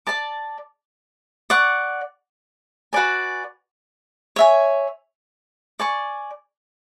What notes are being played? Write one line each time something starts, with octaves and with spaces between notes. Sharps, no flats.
D5 A5 D6
D5 F#5 C#6
F#4 B4 D5 G#5
C#5 E5 G#5
D5 G#5 C#6